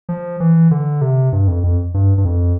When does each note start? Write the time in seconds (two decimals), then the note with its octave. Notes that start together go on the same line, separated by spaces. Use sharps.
0.09 F3
0.40 E3
0.71 D3
1.01 C3
1.32 G2
1.48 F2
1.64 F2
1.94 G2
2.18 G2
2.25 F2